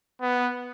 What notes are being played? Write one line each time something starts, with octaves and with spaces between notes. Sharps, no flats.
B3